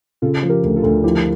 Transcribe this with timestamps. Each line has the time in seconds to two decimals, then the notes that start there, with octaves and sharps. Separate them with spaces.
0.22 C#3 F4 A4
0.43 F3
0.49 G4 A#4
0.64 D2
0.76 F4 A4
0.83 D2
1.04 F3 E4 G4